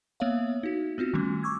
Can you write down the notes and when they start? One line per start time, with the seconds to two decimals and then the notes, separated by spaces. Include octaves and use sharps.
0.20 A#3 B3 C#5 E5 F5
0.63 D#4 F#4
0.98 B3 C4 F4 F#4
1.14 D#3 G3 A3 C#4
1.43 C#6 D6 E6 G#6